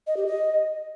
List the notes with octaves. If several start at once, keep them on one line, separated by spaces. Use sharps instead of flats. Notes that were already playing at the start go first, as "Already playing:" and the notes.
D#5
G4
D#5